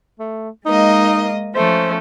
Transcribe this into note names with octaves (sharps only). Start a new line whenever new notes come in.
A3
G#3 A#3 D#4 D#5
F3 A3 C#4 C5